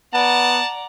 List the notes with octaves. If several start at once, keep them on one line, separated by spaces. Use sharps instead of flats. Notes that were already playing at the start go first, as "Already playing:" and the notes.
B3 D5 F#5 A5 A#5